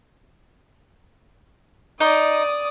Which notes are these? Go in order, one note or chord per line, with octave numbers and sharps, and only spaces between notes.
D#4 D5 D#6